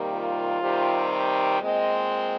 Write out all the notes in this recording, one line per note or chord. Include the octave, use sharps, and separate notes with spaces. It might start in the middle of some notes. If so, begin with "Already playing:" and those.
Already playing: C3 D#3 G3 A#3
F4
C3 D#3 G3 C4
A#2 G#3 C4 D#5